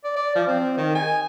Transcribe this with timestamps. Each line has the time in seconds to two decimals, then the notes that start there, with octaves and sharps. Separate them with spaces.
0.04 D5
0.16 D5
0.35 F3
0.47 C4
0.77 D#3
0.95 G#5